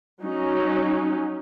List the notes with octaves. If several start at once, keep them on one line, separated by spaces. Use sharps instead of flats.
F#3 C#4 D#4